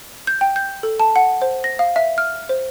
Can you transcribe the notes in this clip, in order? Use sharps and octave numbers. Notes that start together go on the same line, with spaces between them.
G6
G5
G6
A4
A5
F#5
C5
A#6
F5
E5
F6
C5